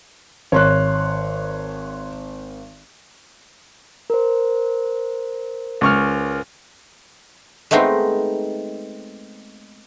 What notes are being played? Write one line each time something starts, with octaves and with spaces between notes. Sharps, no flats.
G#1 C#5 C6 F#6
A#4 C5
C#2 C#6 F6
G#3 A3 B3 C4 D#4